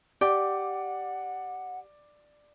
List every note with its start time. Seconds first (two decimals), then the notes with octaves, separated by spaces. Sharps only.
0.21 G4 D5 F#5